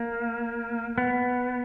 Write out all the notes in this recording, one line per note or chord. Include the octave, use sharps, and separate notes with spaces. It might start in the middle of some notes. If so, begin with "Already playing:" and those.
Already playing: A#3
B3